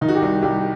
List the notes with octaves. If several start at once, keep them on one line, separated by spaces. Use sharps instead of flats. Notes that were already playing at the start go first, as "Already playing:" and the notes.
D#3 D#4
F#4
G4
C2
C2 G4